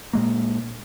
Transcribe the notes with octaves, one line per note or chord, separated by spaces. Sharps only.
A#2 G#3 A#3